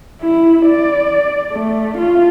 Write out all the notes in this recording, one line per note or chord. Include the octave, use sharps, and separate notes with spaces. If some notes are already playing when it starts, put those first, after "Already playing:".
E4
D5
A3
F4